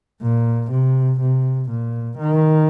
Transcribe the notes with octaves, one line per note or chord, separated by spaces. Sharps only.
A#2
C3
C3
A#2
D#3